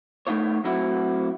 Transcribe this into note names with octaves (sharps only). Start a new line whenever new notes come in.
A3 B3 D#4 F4 C#5
F#3 A3 C4 E4 F#4